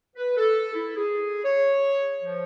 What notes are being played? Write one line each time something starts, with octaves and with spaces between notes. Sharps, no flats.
B4
A4
E4
G#4
C#5
F3